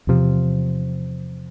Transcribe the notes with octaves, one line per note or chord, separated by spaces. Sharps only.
E2 C3 F3